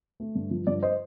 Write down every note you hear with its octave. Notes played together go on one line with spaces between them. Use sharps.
A3
G2
F3
G2 D5
C5 D#5